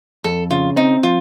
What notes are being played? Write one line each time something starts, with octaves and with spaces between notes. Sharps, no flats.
F2 A4
C#3 F4
C4 D#4
F3 F4